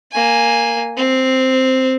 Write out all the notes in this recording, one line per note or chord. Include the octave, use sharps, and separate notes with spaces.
A#3 G#5
C4